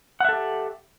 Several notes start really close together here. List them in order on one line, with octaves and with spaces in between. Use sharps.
F#5 E5 A4 G4